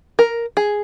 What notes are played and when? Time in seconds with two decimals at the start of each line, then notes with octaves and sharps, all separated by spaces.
0.19 A#4
0.57 G#4